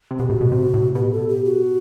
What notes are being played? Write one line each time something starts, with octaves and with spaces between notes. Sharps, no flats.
C3
B2 G4
A2 F#4
B2
C3
A2
B2 G4
A4
G4
F#4